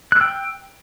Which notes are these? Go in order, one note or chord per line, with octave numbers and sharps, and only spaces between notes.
G5 E6 F#6